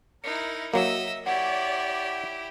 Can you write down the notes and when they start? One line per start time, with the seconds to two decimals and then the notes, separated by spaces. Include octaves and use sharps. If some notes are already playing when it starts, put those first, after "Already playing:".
0.24 D#4 E4 A#4 C#7
0.74 F#3 A#3 D#5 E5 E6
1.26 E4 G4 C#5 D5 F#5